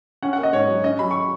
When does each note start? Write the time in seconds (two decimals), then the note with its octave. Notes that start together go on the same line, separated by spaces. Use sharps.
0.22 C#4 F#5
0.33 F#5
0.38 A#3
0.43 D#5
0.53 G#2 C#5
0.68 F#3
0.84 C#4 D#5
0.99 F#3 B5
1.11 C#6